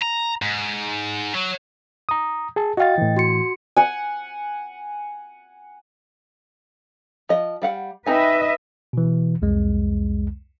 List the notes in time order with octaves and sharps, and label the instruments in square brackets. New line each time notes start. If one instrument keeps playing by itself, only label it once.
[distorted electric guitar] A#5
G#2
F#3
[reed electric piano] A#5 D#6
G#4 A5
[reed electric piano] F#4 F5 [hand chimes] D#5 G5 A6
[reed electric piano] A2 E3
[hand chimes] F#4 C6 C#7
[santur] F#5 G#5
[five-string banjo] F3 D#5
G3 F5 F#5
[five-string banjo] C4 D#4 G#5 [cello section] B4 D#5 E5
[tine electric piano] B2 E3
C2 F2 G#3